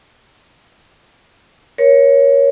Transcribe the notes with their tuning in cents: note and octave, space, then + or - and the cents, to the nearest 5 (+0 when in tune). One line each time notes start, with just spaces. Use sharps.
A#4 +30 C#5 +0